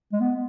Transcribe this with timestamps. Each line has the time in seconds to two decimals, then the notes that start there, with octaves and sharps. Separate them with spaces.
0.13 G#3
0.21 B3